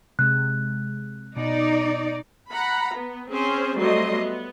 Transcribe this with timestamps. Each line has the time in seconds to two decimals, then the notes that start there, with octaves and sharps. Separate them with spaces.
0.19 C3 G#3 F#6
1.37 B2 D#4 D5
2.50 F#5 A#5 B5
2.93 B3
3.29 C4 C#4 G#4 C5
3.76 F#3 G3 A3 C4 D#5 C6
4.14 B3